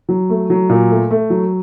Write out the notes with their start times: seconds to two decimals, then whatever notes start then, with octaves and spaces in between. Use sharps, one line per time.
0.09 F#3
0.30 A3
0.50 F#3
0.69 A#2
0.91 A3
1.11 A3
1.30 F#3